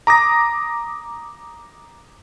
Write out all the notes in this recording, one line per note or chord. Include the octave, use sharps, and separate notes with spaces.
A#5 D6 D#6 A#6